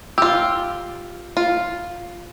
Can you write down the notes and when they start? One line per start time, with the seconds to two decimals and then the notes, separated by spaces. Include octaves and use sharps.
0.18 F4 G4 E6
1.37 F4